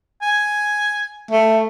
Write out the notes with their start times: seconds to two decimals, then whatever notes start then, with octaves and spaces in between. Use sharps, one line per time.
0.22 G#5
1.31 A3